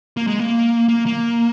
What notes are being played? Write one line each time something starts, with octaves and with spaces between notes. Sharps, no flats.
A#3
G#3
A#3
A#3
A#3